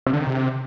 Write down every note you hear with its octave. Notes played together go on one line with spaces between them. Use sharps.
C3
D3
D#3
C3